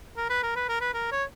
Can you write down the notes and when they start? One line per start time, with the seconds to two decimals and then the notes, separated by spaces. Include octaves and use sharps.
0.17 A#4
0.30 B4
0.43 A#4
0.56 B4
0.69 A#4
0.81 B4
0.94 A#4
1.12 C#5